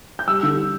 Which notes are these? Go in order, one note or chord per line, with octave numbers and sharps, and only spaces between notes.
G6
G3 E6
D3
D3